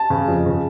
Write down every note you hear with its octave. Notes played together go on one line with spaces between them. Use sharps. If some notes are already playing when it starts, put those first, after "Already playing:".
Already playing: A5
C#3
F2
C#3